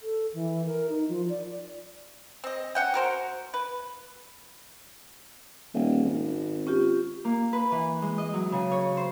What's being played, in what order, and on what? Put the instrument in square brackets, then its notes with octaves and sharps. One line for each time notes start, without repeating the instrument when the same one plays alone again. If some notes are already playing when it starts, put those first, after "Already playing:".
[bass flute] A4
E3
A#4
D#4
F3
D5
[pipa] C4 D#5
C#4 F#5 G5
F#4 A#4 C5
B4
[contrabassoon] D#1
G#1
[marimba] C#4 F4 G4
[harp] A#3
B4
E3
G#3
D#5
F#3
C#3
C#5
C5